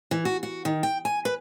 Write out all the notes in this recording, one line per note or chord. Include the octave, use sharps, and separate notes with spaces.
E3
F#4
F#4
D#3
G5
G#5
B4